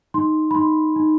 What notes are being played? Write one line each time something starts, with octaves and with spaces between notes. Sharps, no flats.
D#4 C6
B5
D#4 C6
D#4